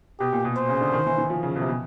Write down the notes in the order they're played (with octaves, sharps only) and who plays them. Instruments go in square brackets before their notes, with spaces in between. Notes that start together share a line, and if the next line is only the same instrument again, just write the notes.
[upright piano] B2 [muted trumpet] G4
[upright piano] A#2
B2
[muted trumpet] C5
[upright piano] C#3
D3
D#3
E3
E3
F3
C#3
B2
C3
B2